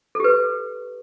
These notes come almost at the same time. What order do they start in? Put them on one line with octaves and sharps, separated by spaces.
A4 G4 B4